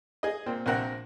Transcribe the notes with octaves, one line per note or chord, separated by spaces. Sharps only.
G#4 D#5
A#2 C4
A#1 C3 C4 A#4 F#5